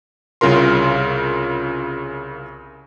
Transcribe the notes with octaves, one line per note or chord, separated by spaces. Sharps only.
C2 C#3 F4 A#4 C6